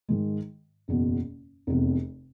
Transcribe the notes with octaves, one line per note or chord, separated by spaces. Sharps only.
G#2 D#3 G#3
F#1 E2 B2
F1 E2 C3